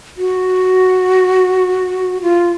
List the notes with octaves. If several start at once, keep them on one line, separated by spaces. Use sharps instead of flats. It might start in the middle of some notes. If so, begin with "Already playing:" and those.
F#4
F4